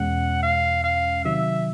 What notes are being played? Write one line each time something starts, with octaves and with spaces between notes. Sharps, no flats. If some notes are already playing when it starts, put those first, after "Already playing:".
Already playing: E2 B2 G#3 C#4 F#5
F5
F5
C3 D#3 F#3 E5